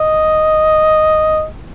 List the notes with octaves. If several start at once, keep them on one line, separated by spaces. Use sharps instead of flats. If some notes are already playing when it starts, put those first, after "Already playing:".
Already playing: D#5